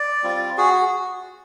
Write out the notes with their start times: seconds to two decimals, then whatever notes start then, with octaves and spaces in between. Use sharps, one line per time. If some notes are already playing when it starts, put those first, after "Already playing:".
Already playing: D5
0.23 G3 C4 F4
0.57 F#4 G#4